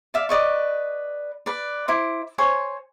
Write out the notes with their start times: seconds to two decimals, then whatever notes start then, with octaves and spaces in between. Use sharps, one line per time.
0.14 D5 E5 F5
0.29 B4 D5 D#5 C#6
1.46 B4 D5
1.88 E4 C5 D6
2.38 C5 C#5 G#5 C#6